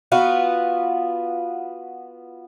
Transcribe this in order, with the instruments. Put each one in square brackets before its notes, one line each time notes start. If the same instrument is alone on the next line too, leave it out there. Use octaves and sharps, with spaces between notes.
[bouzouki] B3 F4 F#4